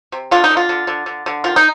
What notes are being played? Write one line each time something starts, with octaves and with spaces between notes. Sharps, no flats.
C3
D3 F4
D#4
D3
F4
D3
D3
D3
D3
D#3 F4
D#4